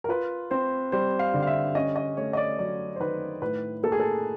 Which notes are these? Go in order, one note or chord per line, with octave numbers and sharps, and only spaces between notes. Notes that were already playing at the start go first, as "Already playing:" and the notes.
A#4
F4 B4
C4 C5
G3 C5
F5
D3
F5
E5
C#4 D#5
D#5
A3 C#5
D#5
D5
F#3 D5
C5
D#3 B4
A2 B4
A#3 A4
G#4
A4